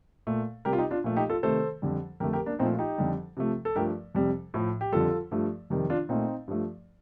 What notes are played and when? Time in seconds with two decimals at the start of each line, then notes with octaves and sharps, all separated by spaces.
0.27 A#2 A3
0.65 C3 G3 G4 A#4
0.73 F4
0.78 D#4 G4
0.91 D4 F4
1.04 A#2 F3 A3
1.16 D#4 G4
1.30 F4 A4
1.43 C3 D#3 A3 A4 C5
1.82 F2 D3 G3
2.20 F2 D3 A3 G4 A#4
2.33 G4 A#4
2.46 A#3 D4
2.59 A#2 F3 A3 C4 D#4
2.74 F4
2.79 D#4 G4
2.98 F2 D3 G3
3.37 C3 F3 A3
3.65 A4
3.76 G2 F3 A3 G4 A#4
4.15 F2 C3 G3
4.54 A2 F3 A3
4.81 G4
4.92 F2 D3 G3 F4 A4
5.31 G2 F3 A3
5.70 F2 C3 D#3 G3
5.90 D4 F4
6.09 A#2 A3 C4 D#4
6.48 G2 F3 A3